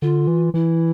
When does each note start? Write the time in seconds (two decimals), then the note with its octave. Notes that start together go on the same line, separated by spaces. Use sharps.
0.02 D3 F4
0.27 E3
0.54 E3 E4